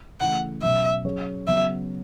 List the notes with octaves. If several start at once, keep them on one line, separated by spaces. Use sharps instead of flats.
C#3 E3 A3 F#5
B2 F#3 C#4 E5
F#3 C#4 G#4 C#5
C#3 F#3 B3 E5